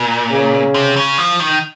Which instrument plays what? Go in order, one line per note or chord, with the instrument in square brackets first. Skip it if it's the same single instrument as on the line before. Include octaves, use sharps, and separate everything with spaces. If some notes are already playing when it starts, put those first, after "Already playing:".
Already playing: [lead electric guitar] A#2
[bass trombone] C#3
[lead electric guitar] C3
C#3
F3
D#3